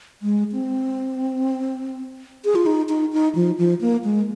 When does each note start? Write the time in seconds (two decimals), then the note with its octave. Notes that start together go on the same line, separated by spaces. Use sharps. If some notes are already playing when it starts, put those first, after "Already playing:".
0.22 G#3
0.52 C4
2.45 G#4
2.55 F4
2.66 D#4
2.89 D#4
3.13 D#4
3.35 F3
3.58 F3
3.81 A#3
4.04 G#3